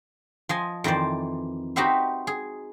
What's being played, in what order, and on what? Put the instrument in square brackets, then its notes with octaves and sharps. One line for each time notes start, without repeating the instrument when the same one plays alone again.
[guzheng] F3 D#5 G#5
F2 D#3 E3 C5 D5
D#4 F#4 G4 B4 C5 E5
G#4